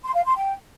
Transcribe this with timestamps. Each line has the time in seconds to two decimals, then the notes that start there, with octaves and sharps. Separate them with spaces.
0.04 C6
0.14 F5
0.25 C6
0.36 G5